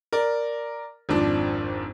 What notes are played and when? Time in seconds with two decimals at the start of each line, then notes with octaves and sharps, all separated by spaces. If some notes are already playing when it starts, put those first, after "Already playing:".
0.13 A#4 D5
1.09 G#1 F2 F3 D4